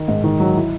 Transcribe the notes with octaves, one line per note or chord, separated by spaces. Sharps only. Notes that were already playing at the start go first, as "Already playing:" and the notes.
Already playing: D#3
G#2
D#3
F#3
E4